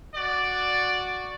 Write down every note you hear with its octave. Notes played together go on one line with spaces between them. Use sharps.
F#4 D5